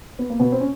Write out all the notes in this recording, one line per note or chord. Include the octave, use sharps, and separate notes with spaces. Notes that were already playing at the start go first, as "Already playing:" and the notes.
B3
A#3
B2 B3
C4
C#4